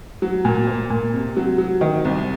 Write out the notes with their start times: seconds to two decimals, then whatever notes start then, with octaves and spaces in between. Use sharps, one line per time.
0.22 F#3
0.45 A#2
0.67 A#3
0.90 A#2
1.14 C3
1.36 F#3
1.58 F#3
1.81 D#3
2.05 C2